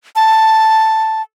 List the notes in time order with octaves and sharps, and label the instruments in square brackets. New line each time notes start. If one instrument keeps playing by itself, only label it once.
[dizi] A5